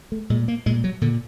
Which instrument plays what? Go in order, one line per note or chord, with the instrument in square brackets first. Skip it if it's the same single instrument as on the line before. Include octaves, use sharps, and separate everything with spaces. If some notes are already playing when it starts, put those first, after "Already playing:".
[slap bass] A3
A#2 G#3
A#3
A#2 G#3
F#3
A#2 D3